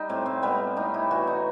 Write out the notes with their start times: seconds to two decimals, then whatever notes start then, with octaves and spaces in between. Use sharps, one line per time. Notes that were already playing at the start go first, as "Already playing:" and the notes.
Already playing: G3 D#4
0.09 A2 C4
0.26 C4
0.42 G3 B3
0.77 A2 D#4
0.94 E4
1.11 E3 F#4
1.27 D#4